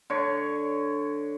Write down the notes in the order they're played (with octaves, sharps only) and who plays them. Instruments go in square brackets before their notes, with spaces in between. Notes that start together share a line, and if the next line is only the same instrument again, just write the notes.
[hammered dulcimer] D3 C#5